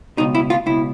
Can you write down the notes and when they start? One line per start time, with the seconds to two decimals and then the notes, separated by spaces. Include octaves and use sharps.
0.17 C#2 B2 D#4
0.35 E4
0.50 F4
0.66 C#2 B2 E4